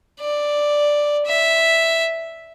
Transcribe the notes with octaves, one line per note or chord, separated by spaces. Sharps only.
D5
E5